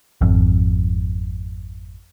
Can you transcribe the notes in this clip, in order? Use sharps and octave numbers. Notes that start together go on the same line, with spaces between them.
G#1 F2